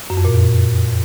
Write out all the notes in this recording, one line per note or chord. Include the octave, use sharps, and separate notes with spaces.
F#2
F2
A#2